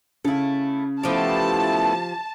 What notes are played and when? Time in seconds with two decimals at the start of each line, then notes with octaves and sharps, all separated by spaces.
0.25 C#3 A3 E4 F5
1.03 F3 A3 B3 E4 G4 A5